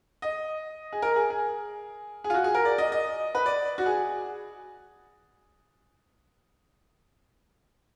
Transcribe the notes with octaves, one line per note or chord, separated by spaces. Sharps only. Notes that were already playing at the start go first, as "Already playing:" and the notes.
D#5
G#4
A#4
G#4
G#4
G#4
F4
F#4
G#4
A#4
D5
D#5
D#5
B4
D5
F#4
G#4